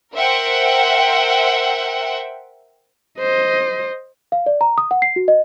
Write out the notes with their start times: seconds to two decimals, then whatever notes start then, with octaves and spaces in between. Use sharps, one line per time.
0.15 A#4 C5 E5 F#5 G5
3.20 C5 D#5
4.32 F5
4.46 D5
4.61 A#5
4.78 D#6
4.91 F#5
5.02 C7
5.16 F#4
5.28 D#5